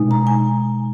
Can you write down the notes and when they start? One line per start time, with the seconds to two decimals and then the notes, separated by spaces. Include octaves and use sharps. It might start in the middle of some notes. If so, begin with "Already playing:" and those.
Already playing: B2 G#3 D#4
0.11 A#5
0.27 G#5